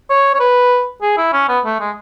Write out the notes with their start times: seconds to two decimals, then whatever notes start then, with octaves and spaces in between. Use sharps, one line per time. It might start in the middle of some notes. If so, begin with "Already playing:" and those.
0.10 C#5
0.34 C#5
0.40 B4
1.02 G#4
1.18 E4
1.33 C#4
1.49 B3
1.65 A3
1.80 G#3